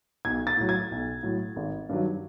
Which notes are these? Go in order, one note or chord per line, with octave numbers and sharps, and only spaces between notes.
B1 G#6
A6
A2 F#3
G#6
B1
A2 F#3
G#1
G2 D#3 F#3